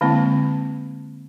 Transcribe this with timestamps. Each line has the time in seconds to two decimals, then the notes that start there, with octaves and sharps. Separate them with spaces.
0.01 D3 G#3 A#3 C4 E4